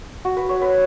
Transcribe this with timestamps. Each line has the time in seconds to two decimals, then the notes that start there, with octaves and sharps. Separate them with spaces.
0.25 F#4
0.37 B4
0.49 C#5
0.61 B4